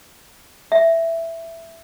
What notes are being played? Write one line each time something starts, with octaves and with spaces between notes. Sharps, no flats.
E5